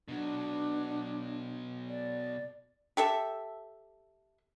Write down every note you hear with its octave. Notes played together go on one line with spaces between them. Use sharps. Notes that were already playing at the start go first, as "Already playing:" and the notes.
B2 F#3 D4
D5
G4 A4 E5